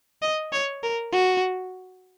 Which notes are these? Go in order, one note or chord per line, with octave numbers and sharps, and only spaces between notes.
D#5
C#5
A#4
F#4